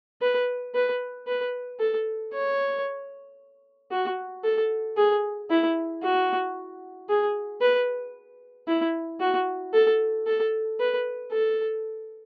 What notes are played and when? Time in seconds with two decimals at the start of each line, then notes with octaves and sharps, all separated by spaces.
0.22 B4
0.75 B4
1.27 B4
1.79 A4
2.33 C#5
3.91 F#4
4.44 A4
4.97 G#4
5.50 E4
6.03 F#4
7.09 G#4
7.61 B4
8.68 E4
9.20 F#4
9.73 A4
10.27 A4
10.80 B4
11.32 A4